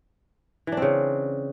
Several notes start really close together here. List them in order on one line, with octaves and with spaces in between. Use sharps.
E3 D4 C4 C#3